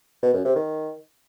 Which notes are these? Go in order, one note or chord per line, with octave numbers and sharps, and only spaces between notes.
B2
F#2
C3
D#3